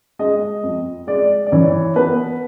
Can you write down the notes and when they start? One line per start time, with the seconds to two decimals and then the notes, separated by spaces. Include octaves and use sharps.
0.19 G#3 D#5
0.63 F2
1.07 G#3 D5
1.46 D5
1.52 E3 C#5
1.96 B3 B4